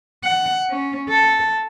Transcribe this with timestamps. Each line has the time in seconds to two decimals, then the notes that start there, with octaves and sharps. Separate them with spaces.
0.24 F#5
0.70 C#4
1.09 A4